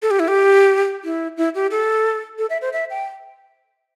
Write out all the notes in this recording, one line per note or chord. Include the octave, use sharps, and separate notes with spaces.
A4
G4
E4
G4
E4
E4
G4
A4
A4
E5
C5
E5
G5